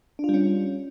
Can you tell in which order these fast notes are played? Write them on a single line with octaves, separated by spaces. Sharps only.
D4 F4 G3 C#4